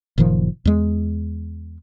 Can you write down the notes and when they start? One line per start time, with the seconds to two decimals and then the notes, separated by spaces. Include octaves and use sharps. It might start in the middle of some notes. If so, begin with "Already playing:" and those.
0.18 F#1 A#2 D#3 F3
0.65 E2 G#3